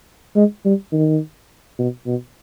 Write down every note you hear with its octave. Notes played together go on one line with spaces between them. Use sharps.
G#3
G3
D#3
B2
B2